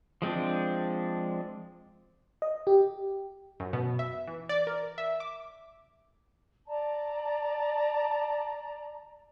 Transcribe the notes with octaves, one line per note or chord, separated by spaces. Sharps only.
F3 G#3 C4 D4
D#5
G4
F#2
B2
E5
E3
D5
A#4
E5
D6
D5 A5 A#5